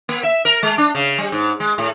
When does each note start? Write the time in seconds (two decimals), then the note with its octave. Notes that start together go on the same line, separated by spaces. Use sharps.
0.09 A#3
0.23 E5
0.45 A#4
0.63 G#3
0.78 D4
0.95 C#3
1.18 G3
1.32 G#2
1.60 G#3
1.78 A2